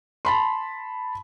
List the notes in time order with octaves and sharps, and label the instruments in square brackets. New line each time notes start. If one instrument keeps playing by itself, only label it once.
[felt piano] A5 B5 C6